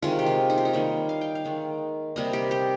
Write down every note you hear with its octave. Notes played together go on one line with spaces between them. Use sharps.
C3 D#3 G#3 F4
G4
F4
D#4
F4
D#4
D#3 G3 A#3 C#5
F5
G5
F5
D#3 G#3
C3 G3 A#3 D#5
G4
G4